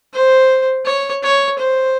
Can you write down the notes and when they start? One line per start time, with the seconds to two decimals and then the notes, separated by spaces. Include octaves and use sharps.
0.14 C5
0.86 C#5
1.23 C#5
1.59 C5